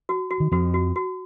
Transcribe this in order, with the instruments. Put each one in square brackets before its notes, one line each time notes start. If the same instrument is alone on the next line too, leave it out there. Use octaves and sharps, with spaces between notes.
[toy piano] F#4
F#4
[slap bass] D#3
[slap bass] F2 F3 [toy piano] F#4
[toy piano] F#4
F#4